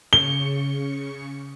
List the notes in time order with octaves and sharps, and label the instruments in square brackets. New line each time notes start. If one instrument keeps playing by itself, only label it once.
[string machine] C#3 C#6 C#7 [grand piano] G7